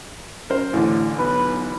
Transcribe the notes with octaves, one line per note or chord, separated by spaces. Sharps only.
F#2 A#4 C5
A1 A2 D3
B1 B4